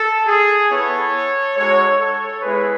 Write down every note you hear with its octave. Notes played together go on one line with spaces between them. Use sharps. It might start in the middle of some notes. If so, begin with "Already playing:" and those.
Already playing: A4
G#4
B3 E4 A4 C#5
G#3 D#4 F#4 A4 C#5
A4 C#5
G#3 B3 E4 G#4 B4